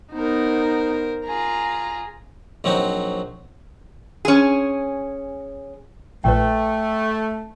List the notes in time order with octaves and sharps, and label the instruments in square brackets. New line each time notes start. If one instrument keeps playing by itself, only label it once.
[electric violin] B3 D#4 [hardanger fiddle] A#4 C5
[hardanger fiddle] F4 G#4 [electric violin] A#5
[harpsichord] A#1 F#3 C4 D#4 F#4
[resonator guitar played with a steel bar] C#4 G#4
[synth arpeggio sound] A#1 A#2 B4 [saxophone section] A3 [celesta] G5